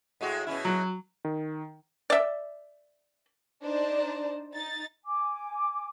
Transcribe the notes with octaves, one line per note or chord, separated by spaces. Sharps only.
A2 G#3 F#4
B2 C#4 E4
F#3
D#3
D5 E5
D4 D#4 C5 D5 A5
D#4 A6
G#5 D6